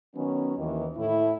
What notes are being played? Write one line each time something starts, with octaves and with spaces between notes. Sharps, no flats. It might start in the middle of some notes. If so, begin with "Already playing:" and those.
D#3 F#3 B3 C#4
D#2 D#3 E3
A2 E4